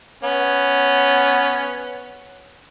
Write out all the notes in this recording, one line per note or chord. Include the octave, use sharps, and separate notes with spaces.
B3 C#4